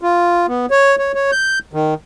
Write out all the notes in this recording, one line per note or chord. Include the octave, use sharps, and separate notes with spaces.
F4
B3
C#5
C#5
C#5
G6
D#3